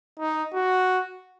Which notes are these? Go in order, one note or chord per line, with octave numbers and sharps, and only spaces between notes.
D#4
F#4